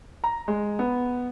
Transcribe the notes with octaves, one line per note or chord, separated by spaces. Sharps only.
A#5
G#3
B3